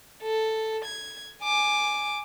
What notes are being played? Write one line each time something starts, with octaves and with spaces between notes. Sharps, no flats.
A4
G#6
G#5 D6